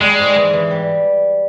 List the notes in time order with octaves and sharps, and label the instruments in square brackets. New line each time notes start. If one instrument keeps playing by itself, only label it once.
[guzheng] G3 [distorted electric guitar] G#3
[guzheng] G#2
E3
E3
G3